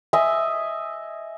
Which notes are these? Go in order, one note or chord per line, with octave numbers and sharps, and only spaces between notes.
D#5 E5 G#5